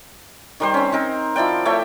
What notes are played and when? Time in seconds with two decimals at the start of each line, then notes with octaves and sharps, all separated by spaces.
0.60 D#3 G3 C5
0.74 C4 C#4
0.92 C4 D#4 A#4
1.36 F3 E4 D5 G5
1.65 A3 C#5 E5 G5